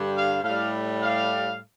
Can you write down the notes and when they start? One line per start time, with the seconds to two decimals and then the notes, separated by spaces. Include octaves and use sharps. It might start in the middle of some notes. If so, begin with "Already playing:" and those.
Already playing: G2 D3 G3
0.14 F5
0.44 A2 F5
0.49 G3
1.02 F5